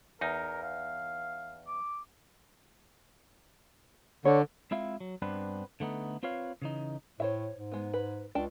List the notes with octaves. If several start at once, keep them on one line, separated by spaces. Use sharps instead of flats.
E2 D#4 A#4
F5
D6
D3 C#5
G#3 C4 E4 F4 E5 F5
F#3
G2 B3 C4 D4 B4
D3 A3 B3 D#4
C4 F4 B4 C#5 F5
C#3 E3 D#4
A2 C5 C#5 E5
G#2
G#3 B3
B4
C#2 D4 G5 A5